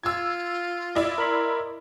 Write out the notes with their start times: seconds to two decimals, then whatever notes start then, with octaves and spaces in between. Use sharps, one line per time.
0.03 F4 E6 G#6
0.95 E4 D5 D#5
1.18 A#4 B5 C6